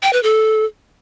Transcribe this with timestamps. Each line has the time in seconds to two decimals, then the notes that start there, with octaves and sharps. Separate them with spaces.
0.03 G5
0.13 B4
0.23 A4